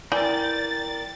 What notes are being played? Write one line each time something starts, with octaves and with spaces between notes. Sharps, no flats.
E3 A#4 D5 G5 A6